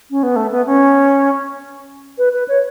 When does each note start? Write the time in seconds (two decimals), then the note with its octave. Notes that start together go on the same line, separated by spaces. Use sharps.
0.11 C#4
0.23 B3
0.36 A3
0.52 B3
0.66 C#4
2.18 B4
2.33 B4
2.48 C#5